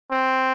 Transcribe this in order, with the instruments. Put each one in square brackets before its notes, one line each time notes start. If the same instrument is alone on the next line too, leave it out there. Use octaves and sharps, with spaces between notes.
[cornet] C4